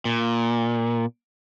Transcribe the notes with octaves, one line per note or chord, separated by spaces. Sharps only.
A#2